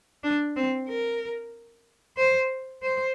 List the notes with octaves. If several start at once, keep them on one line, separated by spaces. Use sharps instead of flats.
D4
C4
A#4
C5
C5